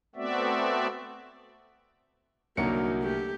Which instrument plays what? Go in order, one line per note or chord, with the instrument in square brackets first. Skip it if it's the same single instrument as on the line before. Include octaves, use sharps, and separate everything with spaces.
[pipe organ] A3 B3 C4 F#4 D5 E5
[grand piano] C2 A#4 C#7 [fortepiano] D3 F#3 [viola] A#3 D#4 [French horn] F#4
[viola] A3 G4